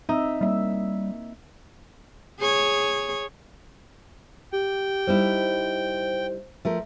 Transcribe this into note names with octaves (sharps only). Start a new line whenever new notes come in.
C4 D#4 D#5 E5
G3 A#3 E5
G#4 C#5
G4 G5
G3 D#4 E4 C5
F3 A3 A#4 E5